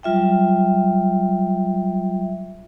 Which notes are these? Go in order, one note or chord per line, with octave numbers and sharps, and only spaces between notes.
F#3 G3 F4 E5 G5